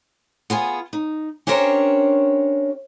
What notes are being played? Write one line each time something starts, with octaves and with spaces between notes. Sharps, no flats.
B3 F4 G#4 G#5
D#4
C#4 D4 G4 A#4 C5 C#5